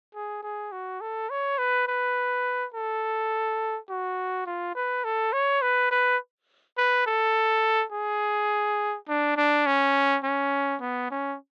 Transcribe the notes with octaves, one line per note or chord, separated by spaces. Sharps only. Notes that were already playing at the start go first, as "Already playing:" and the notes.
G#4
G#4
F#4
A4
C#5
B4
B4
A4
F#4
F4
B4
A4
C#5
B4
B4
B4
A4
G#4
D4
D4
C#4
C#4
B3
C#4